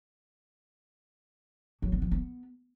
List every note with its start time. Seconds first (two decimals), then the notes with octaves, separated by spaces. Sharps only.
1.82 F#3
1.92 B3
2.02 F3
2.11 B3